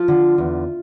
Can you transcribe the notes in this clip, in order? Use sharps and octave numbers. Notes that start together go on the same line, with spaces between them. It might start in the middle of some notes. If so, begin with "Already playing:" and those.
Already playing: F3 F4
D3
E2